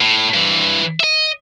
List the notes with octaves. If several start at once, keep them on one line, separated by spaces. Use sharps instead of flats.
A2
G2 E3
D#5 E5